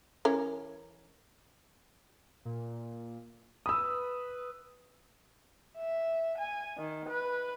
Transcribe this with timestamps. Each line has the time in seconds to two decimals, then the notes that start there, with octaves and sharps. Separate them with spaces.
0.25 E3 C#4 A#4
2.45 A#2
3.66 B4 D#6 E6
5.78 E5
6.38 G#5
6.78 D#3
7.09 B4